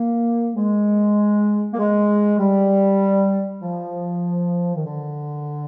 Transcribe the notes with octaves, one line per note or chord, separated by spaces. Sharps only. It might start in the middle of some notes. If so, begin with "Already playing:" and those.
Already playing: A#3
G#3
A#3
G#3
G3
F3
D#3
D3